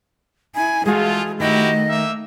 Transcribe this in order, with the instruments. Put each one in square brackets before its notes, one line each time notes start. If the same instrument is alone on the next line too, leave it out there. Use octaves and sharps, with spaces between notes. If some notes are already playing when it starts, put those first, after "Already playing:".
[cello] E4 [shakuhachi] G#5
[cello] E3 [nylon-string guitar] G#3 F#4 [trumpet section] A3 F4 [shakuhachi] G#4
[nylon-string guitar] D#3 [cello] A3 [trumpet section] E4 F#4 G4 [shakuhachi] D#5
[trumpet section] A#3 D#4 E5